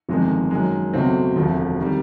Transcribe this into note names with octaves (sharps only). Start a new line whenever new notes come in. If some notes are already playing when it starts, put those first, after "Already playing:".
G1 F2 C3 D#3 G#3
F#2 D#3 G#3
C#2 B2 F#3 A3 C4
E1 D2 C3 F3 A3
C3 D#3 G3